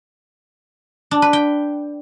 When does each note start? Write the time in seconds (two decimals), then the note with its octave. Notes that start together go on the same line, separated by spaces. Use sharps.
1.11 D4
1.22 B4
1.33 G5